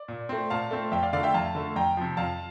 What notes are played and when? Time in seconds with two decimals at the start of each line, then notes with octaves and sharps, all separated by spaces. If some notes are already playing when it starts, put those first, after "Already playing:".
Already playing: D5
0.08 A#2
0.29 A3 C4
0.50 A#2 F5 A5
0.71 A3 C4
0.92 F2 E5 G5
1.03 D5 F5
1.13 D3 A3 D5 F5
1.23 E5 G5
1.34 F2 F5 A5
1.55 D3 A3
1.76 F2 G5 A#5
1.97 C3 F3
2.17 F2 F5 A5